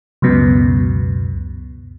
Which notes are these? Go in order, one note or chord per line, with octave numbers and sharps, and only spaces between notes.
C#2 F#2 B2